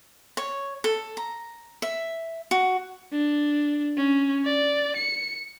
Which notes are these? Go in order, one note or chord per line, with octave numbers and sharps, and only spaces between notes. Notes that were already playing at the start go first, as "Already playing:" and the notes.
C#5
A4
A#5
E5
F#4
D4
C#4
D5
C#7